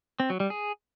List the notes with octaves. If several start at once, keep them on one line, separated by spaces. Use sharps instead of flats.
C4
F#3
G3
G#4